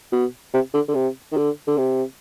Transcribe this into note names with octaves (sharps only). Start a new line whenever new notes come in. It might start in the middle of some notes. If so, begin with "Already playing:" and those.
B2
C3
D3
D3
C3
D#3
D3
D3
C3